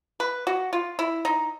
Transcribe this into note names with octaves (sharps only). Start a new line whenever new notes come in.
B4
F#4
F4
E4
D#4